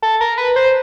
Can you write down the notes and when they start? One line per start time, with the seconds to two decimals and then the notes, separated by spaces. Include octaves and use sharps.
0.02 A4
0.21 A#4
0.38 B4
0.56 C5